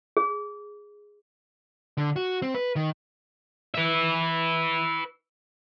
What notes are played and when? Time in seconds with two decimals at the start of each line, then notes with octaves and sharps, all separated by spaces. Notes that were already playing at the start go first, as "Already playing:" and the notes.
0.17 G#4
1.97 D3
2.16 F#4
2.42 C4
2.55 B4
2.76 D#3
3.75 B4 E5